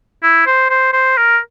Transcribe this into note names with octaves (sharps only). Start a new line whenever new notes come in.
E4
C5
C5
C5
A#4